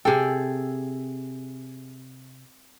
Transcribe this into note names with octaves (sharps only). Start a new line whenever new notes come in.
C3 G#4 A4 G5